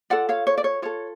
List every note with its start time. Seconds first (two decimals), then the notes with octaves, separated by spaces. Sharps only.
0.10 F4 A4 D5 F#5
0.29 C#5 F5
0.47 C#5
0.58 D5
0.64 C#5
0.82 F4 A4 C#5